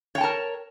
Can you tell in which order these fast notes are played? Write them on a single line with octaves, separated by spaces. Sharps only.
C#5 G5 A5 A#4